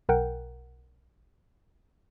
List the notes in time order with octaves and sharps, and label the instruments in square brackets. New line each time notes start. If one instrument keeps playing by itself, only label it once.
[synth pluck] B1 A#4 F#5 G5